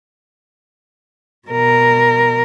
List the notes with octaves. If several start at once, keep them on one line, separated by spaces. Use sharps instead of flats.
B2 A#4